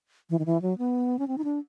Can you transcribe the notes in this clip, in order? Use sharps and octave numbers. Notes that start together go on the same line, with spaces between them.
E3
D#3
E3
F#3
B3
C#4
C4
D#4
D4